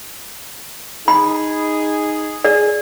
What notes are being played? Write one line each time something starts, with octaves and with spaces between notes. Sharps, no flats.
D#4 G#4 B5
G#4 D5